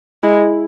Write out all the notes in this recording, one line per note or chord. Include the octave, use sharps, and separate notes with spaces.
G#3 E4